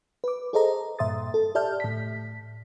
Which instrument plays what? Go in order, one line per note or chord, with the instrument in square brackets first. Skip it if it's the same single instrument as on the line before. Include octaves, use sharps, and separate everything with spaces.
[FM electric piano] B4 D6
G#4 A4 C5 D#5 A#5
G2 A#2 E5 C6 D#6 A6
A4
G4 D5 E5 A5 F6 G6
A2 B6